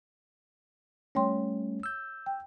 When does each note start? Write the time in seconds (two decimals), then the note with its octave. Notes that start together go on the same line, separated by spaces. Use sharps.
1.15 G3 A3 C#4 C#5 G5 C6
1.83 E6 G6
2.26 G5